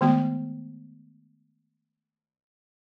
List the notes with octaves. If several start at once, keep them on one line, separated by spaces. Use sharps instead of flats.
D#3 G#3 A3 B3 F#4